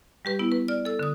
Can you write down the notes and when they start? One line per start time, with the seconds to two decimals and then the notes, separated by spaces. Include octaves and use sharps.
0.25 G3 G4 B4
0.39 B3 E4
0.52 B4
0.68 D5 F6
0.85 A4 E6
0.99 D3 D#6